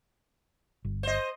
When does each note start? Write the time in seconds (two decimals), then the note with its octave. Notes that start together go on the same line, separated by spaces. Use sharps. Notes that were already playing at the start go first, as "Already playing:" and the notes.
0.85 G1
1.03 C5 D#5